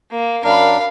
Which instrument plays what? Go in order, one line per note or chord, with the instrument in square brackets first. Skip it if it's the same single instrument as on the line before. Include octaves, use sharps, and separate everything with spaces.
[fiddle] A#3
[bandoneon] F#2 D4 A#4 [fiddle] F5 B5